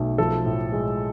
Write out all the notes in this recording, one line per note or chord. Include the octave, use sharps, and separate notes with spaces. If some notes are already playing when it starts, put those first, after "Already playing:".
Already playing: B1 A3
F3 A4
A2
G#3